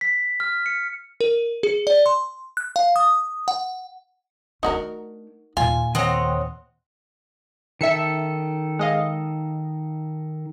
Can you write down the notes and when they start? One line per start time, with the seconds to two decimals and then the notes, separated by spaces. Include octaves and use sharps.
0.01 B6
0.40 F6
0.66 C#7
1.21 A#4
1.63 G#4
1.87 D5
2.06 C6
2.57 F#6
2.76 F5
2.96 D#6
3.48 F#5
4.63 A3 D4 D#4 F#4 A#4
5.57 D#2 A#2 F4 G#5
5.95 D#3 C4 C#5 D#5 F#5
7.81 D#3 A4 E5 C#7
8.79 G#3 D#5 F5